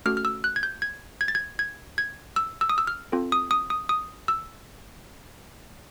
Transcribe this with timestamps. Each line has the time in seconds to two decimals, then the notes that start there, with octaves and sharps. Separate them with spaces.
0.06 A3 C#4 F#4 A4 F6
0.17 F6
0.25 E6
0.44 F#6
0.56 G#6
0.63 G6
0.82 G#6
1.21 G#6
1.28 A6
1.35 G#6
1.59 G#6
1.98 G#6
2.36 E6
2.61 E6
2.69 D#6
2.78 E6
2.87 F6
3.12 C4 F4 A4
3.32 D#6
3.51 D#6
3.70 D#6
3.89 D#6
4.28 E6